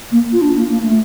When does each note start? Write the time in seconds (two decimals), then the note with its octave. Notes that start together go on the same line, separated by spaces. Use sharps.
0.11 A#3
0.32 F4
0.42 D4
0.56 A#3
0.69 A#3
0.83 A3